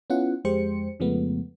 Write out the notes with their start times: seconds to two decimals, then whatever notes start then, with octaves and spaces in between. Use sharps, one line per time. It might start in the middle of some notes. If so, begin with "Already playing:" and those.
0.10 B3 C#4 E4 F4 F#5
0.45 F2 G#3 G4 C5 C#7
1.00 F2 C#3 F3 G#3 A3 B3